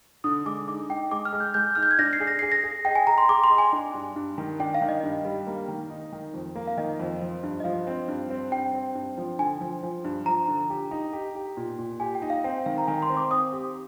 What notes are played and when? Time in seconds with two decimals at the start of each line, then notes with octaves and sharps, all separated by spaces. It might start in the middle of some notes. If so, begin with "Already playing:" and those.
0.24 D3 D#6
0.46 G#3 D6
0.67 D#4 D6
0.89 D#4 G5
1.11 G#3 D6
1.25 F6
1.33 G#3
1.40 G6
1.54 G#3 G6
1.75 D#4 F6
1.83 G6
1.91 G#6
1.98 D4 A#6
2.13 C7
2.20 G#4
2.27 A#6
2.39 G#4 C7
2.52 A#6
2.64 G#4
2.85 D#5 G5
2.95 G#5
3.07 G#4 A#5
3.18 C6
3.29 G#4 D6
3.44 C6
3.51 D#5
3.58 G#5
3.73 D4
3.94 G2
4.16 G2
4.38 D#3
4.60 D4 G5
4.74 F5
4.81 D#3
4.89 D#5
5.03 G2
5.25 G3
5.47 A#3
5.68 D#3
5.90 D#4
6.13 D#3
6.34 F2
6.55 A#3
6.68 F5
6.77 D#3 D#5
6.99 F2
7.21 F3
7.43 G2
7.60 D#5
7.64 F3 F5
7.87 C4
8.08 G2
8.30 C4
8.52 G2 G5
8.74 C4
8.95 G2
9.17 F3
9.39 D3 G#5
9.61 F3
9.83 F3
10.04 G2
10.26 F3 A#5
10.48 D3
10.70 G4
10.91 D#4
11.13 G4
11.35 G4
11.57 A#2
11.78 A#2
12.00 G4 G#5
12.15 G5
12.22 D#4
12.30 F5
12.44 C4 G5
12.66 D#3 F5
12.78 A#5
12.87 D#3 G#5
13.02 C6
13.10 C4
13.17 D6
13.31 C4 D#6
13.52 G4